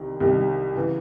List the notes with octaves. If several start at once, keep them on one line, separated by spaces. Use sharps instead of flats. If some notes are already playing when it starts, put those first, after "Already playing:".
Already playing: C2 C3 D#3
C2 C3 D#3
C#3 E3